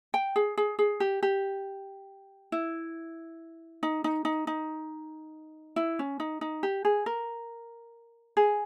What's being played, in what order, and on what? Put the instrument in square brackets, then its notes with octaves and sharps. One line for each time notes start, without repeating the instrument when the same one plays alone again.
[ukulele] G5
G#4
G#4
G#4
G4
G4
E4
D#4
D#4
D#4
D#4
E4
C#4
D#4
D#4
G4
G#4
A#4
G#4